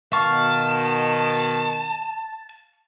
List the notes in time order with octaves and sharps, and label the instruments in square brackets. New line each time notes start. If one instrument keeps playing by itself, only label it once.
[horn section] B2 D#3 [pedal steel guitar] F5 C#6 [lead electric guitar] A5